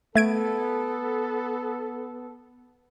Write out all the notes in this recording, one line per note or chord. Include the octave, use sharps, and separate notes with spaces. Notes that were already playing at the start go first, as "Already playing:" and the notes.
A3 B3 A4 G#6 D7